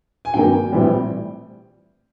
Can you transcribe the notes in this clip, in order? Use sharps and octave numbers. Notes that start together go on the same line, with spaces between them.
G#5
G2 D#3 F#3 A#3 G5
A#1 A2 E3 G3 C4